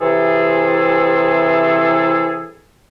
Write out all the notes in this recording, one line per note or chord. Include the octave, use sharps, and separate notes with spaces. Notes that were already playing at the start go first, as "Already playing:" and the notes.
C3 E3 G#4 A4